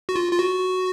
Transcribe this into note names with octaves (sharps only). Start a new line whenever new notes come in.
F#4
F4
F4
F#4